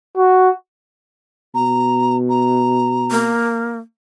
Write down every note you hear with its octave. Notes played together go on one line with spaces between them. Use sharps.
F#4
B2 A#5
A#5
A#3